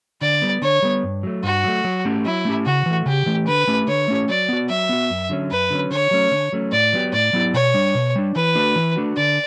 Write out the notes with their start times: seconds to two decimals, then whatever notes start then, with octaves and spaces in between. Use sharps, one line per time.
0.21 D3 D5
0.42 G3 B3
0.62 D3 C#5
0.82 G3 B3
1.04 G2
1.23 F#3 A3
1.43 G2 F#4
1.64 F#3 A3
1.84 F#3
2.05 A3 C#4 G4
2.25 F#3 E4
2.45 A3 C#4 G4
2.66 C#3 F#4
2.86 E3 A3
3.06 C#3 G4
3.26 E3 A3
3.47 D3 B4
3.68 A3 C#4 G4
3.87 D3 C#5
4.08 A3 C#4 G4
4.29 F#3 D5
4.49 B3 F#4
4.69 F#3 E5
4.89 B3 F#4
5.10 F#2
5.30 D3 F#3 C#4
5.51 F#2 B4
5.70 D3 F#3 C#4
5.91 D3 C#5
6.11 F#3 A3 C#4
6.31 D3
6.52 F#3 A3 C#4
6.72 A2 D5
6.93 F#3 B3 E4 G4
7.13 A2 D5
7.33 F#3 B3 E4 G4
7.53 B2 C#5
7.74 G3 D4
7.95 B2
8.16 G3 D4
8.35 E3 B4
8.55 A3 D4 F#4
8.76 E3
8.96 A3 D4 F#4
9.17 D3 D5